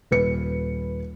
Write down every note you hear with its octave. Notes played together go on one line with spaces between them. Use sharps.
D#1 B4 C#7